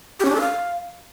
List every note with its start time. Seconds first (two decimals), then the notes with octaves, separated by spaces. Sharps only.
0.20 G4
0.25 C#4
0.30 D4
0.35 A4
0.40 F5